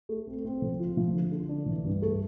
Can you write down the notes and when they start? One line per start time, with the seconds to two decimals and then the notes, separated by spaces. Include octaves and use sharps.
0.09 A3
0.27 C4
0.45 C4
0.62 F3
0.79 F4
0.97 F3
1.14 D3
1.32 D3
1.49 D4
1.66 E3
1.84 G2
2.02 A3